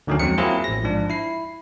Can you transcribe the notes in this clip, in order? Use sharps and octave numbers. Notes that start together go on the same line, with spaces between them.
D2 D3 D#3 F#3 C#4
F2 F#3 G#3 C4 C#7
F#3 A#3 C4 E4 F4 G#4
A1 A#6
G#2 F3 D4
E4 C7